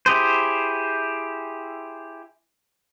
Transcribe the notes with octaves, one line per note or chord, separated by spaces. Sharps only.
E4 G4 G#4 C5